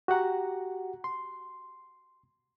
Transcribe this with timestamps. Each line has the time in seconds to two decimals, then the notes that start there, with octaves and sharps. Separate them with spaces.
0.08 F#4 G4 F#5 A#5
1.04 C6